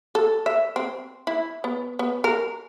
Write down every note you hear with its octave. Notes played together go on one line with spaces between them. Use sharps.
A4
E5
C4
E4
B3
B3
A#4